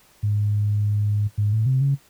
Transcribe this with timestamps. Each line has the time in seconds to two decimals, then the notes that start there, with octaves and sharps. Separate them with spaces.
0.23 G#2
1.38 G#2
1.53 A2
1.66 C3
1.81 C#3